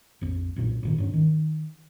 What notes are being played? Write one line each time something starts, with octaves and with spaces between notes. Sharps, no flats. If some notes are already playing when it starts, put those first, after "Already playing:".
A#1 F2
B1 F#2 A#2
G1 A#2 D#3
D#1 G2 C#4
D#3